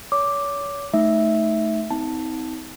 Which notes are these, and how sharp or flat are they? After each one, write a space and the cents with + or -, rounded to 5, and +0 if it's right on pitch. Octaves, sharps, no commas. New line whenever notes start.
C#5 +30 D6 +0
A3 -10 D#4 +0 E5 +0
C4 -30 D#4 +35 A5 +0